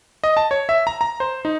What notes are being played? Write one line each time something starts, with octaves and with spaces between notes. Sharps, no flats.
D#5
A5
C#5
E5
A#5
A#5
C5
D#4